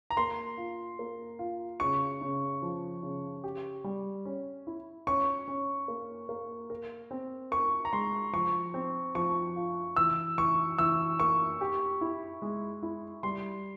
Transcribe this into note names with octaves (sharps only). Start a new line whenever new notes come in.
A#5
A#3 C6
F4
A#3
F4
C#3 C#6
C#3
F3
C#3
G4
G3
C#4
E4
C#4 C#6
C#4
A#3
A#3
A#4
C4
A#4 C#6
A#5
G#3 C6
F3 C#6
C4
F3 C#6
F4
E3 E6
E3 C#6
E3 E6
A#3 C#6
G4
E4
G#3
E4
G3 C6